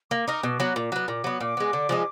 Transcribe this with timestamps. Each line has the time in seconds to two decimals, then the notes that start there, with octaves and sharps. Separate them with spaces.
0.11 A#3 D6
0.28 D#4 A#4
0.43 B2
0.60 F#3 B3
0.76 A#2
0.92 F#3 B3
1.08 A#2 D6
1.24 F#3 B3
1.40 A#2 D6
1.57 G#3 B3
1.73 D3
1.89 F3 G#3 D#4